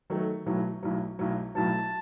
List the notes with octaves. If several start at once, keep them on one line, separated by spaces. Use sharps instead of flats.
D#3 F#3 A3
B1 A2 F#3
B1 A2 F#3
B1 A2 F#3
B1 A2 F#3 A5